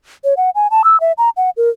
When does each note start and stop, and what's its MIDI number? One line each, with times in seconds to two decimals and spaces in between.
0.24 0.34 73
0.37 0.50 78
0.55 0.67 80
0.71 0.82 81
0.84 1.00 88
1.00 1.12 76
1.18 1.29 82
1.37 1.50 78
1.57 1.70 70